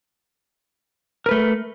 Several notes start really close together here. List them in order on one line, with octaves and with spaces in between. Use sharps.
A#4 B4 A3